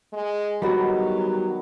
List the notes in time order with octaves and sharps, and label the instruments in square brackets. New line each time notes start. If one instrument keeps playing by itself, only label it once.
[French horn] G#3
[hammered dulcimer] D#3 B3 G#4 [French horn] F#3 [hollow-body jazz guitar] G3 F#4